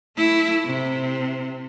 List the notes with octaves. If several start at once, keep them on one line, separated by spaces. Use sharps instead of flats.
A3 E4
C3